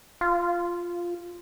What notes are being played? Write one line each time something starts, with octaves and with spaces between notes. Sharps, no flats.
F4